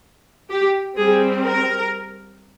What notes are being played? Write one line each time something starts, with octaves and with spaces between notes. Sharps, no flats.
G4
G3 C4 G#4
A#4